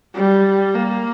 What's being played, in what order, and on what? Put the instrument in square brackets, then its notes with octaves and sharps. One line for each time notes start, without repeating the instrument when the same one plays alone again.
[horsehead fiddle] G3
A#3